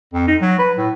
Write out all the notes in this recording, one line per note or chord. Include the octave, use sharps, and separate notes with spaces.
F2
D#4
F#3
B4
A2